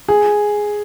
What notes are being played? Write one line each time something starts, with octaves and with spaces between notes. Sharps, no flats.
G#4